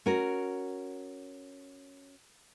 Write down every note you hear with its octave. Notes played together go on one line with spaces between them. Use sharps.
C#4 F#4 A#4